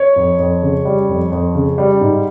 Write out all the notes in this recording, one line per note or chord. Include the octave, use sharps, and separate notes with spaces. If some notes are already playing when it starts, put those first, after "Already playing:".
Already playing: C#5
F2
F2
C#3
G3
F2
F2
C#3
G3
G#2